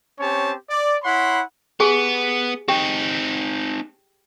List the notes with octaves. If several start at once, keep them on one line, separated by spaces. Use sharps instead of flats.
C4 C#4 G4 C#5 A5
D5
E4 C#5 F#5 B5 C6
B3 G4 G#4 G#5
C4 D#4 G4 G5